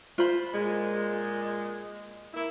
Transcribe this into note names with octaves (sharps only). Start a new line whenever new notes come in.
F4 C5 B5
A#2 G#3
A#3 E4